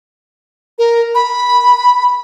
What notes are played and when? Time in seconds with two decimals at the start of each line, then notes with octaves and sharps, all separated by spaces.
0.78 A#4
1.15 B5